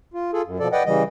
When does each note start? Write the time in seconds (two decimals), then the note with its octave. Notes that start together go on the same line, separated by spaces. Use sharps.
0.14 F4
0.33 F4 G#4 A4
0.45 F#2
0.59 B2 F3 A4 D5
0.72 B4 D5 D#5 F#5 G5
0.86 C#3 E3 G3 D#5